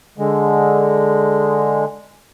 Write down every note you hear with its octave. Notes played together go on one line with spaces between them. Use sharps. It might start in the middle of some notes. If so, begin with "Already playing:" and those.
D3 G#3